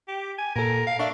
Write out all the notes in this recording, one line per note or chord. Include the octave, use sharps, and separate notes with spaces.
G4
G#5
A#2 A4 A#4
F5
D4 E5 F5 C#6